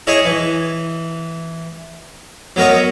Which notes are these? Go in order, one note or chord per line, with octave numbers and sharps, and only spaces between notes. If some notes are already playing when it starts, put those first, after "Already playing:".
E4 G#4 C#5 D#5
E3
F#3 B3 A#4 C#5 D#5